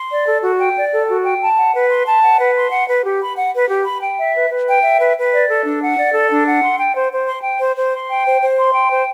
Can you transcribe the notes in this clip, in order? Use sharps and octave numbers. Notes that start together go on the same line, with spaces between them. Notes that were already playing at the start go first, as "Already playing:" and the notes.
Already playing: C6
D5
A4
F#4
G5
D5
A4
F#4
G5
A5
F#5
B4
C6
A5
F#5
B4
C6
F#5
B4
G4
B5
F#5
B4
G4
B5
G5
E5
B4
B4
G5
E5
B4
B4
D5
A4
D4
F#5
D5
A4
D4
F#5
C6
G5
C5
C5
C6
G5
C5
C5
C6
G5
C5
C5
C6
G5
C5